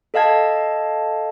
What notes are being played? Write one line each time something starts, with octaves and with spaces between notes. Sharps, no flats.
A4 D#5 F5 A5 G#6